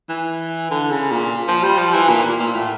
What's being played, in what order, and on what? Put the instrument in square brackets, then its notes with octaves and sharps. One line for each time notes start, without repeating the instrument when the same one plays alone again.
[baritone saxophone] E3
D3
C#3
A#2
F3
G3
F3
E3
A#2
A#2
A#2
A2